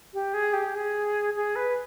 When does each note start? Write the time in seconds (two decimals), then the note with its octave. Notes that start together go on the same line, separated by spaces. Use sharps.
0.14 G4
0.34 G#4
0.54 G4
0.75 G#4
1.36 G#4
1.56 B4